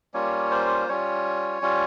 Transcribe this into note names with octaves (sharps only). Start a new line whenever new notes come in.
G3 A#3 C#4 F4 C#5
C5
G3 C#4 F4 C#5
G3 C#4 F4